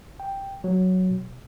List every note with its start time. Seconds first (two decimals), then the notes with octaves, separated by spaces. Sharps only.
0.20 G5
0.64 F#3
1.10 B2